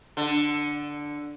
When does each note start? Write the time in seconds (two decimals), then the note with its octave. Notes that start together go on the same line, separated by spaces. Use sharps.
0.17 D3